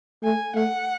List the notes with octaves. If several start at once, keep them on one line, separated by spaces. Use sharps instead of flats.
A3 G#5
A3 F#5